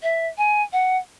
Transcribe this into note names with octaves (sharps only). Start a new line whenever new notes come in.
E5
G#5
F#5